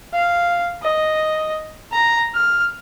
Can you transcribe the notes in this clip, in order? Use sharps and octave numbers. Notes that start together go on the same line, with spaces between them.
F5
D#5
A#5
F6